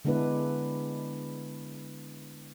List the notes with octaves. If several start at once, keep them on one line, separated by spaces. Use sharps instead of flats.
D3 G#3 B3 D4 E4 B4